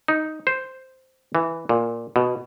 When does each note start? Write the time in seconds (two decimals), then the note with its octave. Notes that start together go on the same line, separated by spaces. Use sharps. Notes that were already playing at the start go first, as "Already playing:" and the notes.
0.08 D#4
0.47 C5
1.35 E3
1.69 A#2
2.16 B2